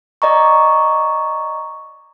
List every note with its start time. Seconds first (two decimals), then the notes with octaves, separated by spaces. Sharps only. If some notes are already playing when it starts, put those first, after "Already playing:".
0.22 D5 D#5 A#5 C#6